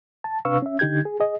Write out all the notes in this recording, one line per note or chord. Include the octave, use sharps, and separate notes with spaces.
A5
C3 D4 B4 F5 C#6 E6
C#4 E5
D3 D#4 G4 G6 G#6
G#4
G#4 D#5